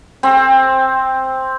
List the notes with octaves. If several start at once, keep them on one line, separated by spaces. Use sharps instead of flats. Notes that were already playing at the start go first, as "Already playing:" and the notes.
C4